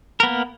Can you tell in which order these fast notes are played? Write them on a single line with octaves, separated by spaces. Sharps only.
A#4 B3 A#3